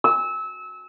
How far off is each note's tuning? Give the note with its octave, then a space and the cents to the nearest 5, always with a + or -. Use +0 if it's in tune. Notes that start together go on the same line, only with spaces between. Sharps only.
E6 -25